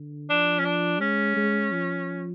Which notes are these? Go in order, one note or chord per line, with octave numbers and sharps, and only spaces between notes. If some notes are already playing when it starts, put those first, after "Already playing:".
Already playing: D3
F3 D4
C#4
D4
G#3 C#4
G#3
F3